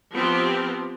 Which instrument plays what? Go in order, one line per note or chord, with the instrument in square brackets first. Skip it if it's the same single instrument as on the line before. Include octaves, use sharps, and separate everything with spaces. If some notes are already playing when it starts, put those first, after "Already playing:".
[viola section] F3 B3 C4 F4 G4